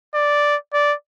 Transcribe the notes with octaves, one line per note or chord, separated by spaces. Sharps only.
D5
D5